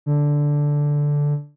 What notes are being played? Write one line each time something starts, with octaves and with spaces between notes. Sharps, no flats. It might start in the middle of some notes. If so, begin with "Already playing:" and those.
D3